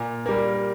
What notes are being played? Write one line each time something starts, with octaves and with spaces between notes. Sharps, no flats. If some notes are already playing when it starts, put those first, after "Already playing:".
Already playing: A#2
G3 A#3